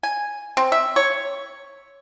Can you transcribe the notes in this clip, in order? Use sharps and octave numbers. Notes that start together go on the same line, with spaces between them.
G#5
C4
E5
C#5